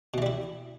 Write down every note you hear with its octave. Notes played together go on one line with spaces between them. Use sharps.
B2 E3 G3 E4